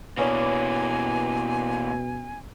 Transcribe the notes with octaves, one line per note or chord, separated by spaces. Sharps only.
B2 E3 A#3 B3 C#4 D4 G#5